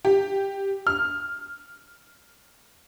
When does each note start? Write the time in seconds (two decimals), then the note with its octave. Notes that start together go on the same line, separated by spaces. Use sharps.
0.05 G4
0.87 F6